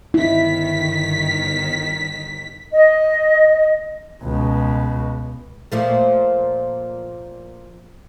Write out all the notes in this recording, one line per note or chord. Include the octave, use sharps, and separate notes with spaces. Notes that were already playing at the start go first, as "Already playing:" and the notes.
G1 D#3 E4 B6
D#5
C#2 B2
A#2 F3 A3